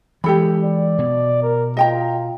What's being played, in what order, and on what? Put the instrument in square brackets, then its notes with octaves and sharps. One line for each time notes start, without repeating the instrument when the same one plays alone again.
[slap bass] E3 G#3 [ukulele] G4 A4 B5
[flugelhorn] D5
[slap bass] B2
[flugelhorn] A#4
[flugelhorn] F4 [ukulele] D#5 G5 A#5